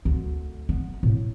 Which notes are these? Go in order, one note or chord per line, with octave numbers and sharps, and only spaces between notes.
D2
B3
A2